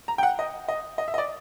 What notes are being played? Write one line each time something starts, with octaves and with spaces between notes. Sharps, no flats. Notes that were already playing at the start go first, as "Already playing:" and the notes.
A#5
G5
F#5
D#5
D#5
D#5
E5
D#5
D5